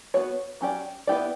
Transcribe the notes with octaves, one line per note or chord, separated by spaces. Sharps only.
B3 F#4 C#5
F#3 C#4 G4 D5
B3 E4 G4 D5